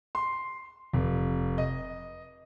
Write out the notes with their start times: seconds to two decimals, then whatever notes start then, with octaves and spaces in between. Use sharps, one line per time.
0.15 C6
0.93 F1
1.58 D#5